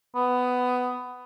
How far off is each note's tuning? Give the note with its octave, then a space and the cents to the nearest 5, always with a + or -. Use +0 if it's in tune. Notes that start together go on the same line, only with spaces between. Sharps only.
B3 +15